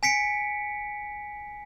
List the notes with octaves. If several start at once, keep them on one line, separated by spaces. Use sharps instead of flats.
G#5 B6 C#7 D7